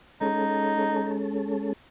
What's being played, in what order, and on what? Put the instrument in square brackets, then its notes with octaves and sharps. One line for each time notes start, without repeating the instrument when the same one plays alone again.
[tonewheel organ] G#3 C#4 A4 [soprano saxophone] D#4